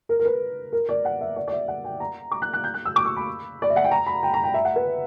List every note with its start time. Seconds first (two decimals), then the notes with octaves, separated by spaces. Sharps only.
0.09 A#4
0.19 A#4
0.25 B4
0.73 A#4
0.89 D5
1.05 F#5
1.21 E5
1.36 D5
1.48 D5
1.52 E5
1.68 F#5
1.84 G5
2.00 A#5
2.32 D6
2.42 F#6
2.53 F#6
2.64 G6
2.74 F#6
2.85 E6
2.96 D6
3.05 C#6
3.17 B5
3.62 D5
3.70 E5
3.76 F#5
3.84 G5
3.91 A#5
4.07 B5
4.23 G5
4.34 A#5
4.44 G5
4.54 E5
4.65 F#5
4.76 B4